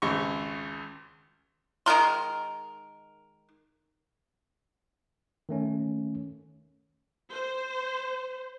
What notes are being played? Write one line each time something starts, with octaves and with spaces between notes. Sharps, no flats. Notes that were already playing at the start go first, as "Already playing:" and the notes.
G#1 C#2 C#6
D#3 G#3 A#4 C6
D#3 A3 C#4
C5